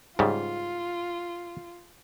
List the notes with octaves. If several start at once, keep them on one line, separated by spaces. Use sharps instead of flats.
G#2 C#3 G3 F4